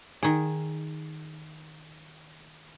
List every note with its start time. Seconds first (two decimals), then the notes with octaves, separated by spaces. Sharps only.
0.23 D#3 G#4